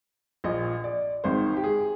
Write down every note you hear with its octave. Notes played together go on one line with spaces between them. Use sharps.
A#1 A#2 D#5
D5
G#1 G#2 D#3 C5
G4
G#4